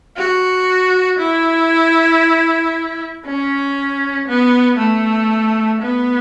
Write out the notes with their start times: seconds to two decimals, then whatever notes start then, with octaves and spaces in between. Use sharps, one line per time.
0.17 F#4
1.19 E4
3.25 C#4
4.28 B3
4.79 A3
5.82 B3